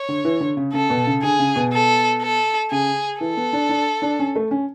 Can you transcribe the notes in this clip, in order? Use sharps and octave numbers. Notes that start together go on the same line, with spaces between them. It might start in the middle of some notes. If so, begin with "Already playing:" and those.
Already playing: C#5
D3
E3
D3
C#3
C#3 A4
B2
C#3
D3 G#4
C#3
B2
A4
A4
C#3 G#4
E3 A4
B3
D4
D4
D4
C#4
A3
C#4